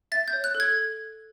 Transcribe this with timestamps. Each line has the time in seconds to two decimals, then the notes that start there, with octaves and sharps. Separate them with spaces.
0.12 E5 A6
0.28 G6
0.33 C#5
0.44 F#6
0.55 A4
0.60 G#6